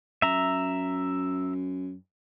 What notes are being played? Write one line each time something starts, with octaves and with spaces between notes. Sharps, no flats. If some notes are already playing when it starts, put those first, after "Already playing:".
F#2 E5 A#5